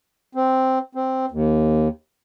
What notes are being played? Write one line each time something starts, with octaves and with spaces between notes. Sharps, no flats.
C4
C4
D#2